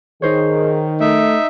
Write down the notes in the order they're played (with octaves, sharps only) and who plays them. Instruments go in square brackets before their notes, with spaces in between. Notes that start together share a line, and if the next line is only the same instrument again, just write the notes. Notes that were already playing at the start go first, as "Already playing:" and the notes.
[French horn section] D#3 [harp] D#4 C5 C#5 [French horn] G#4
[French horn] A3 [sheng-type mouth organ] D#4 E5 [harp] D7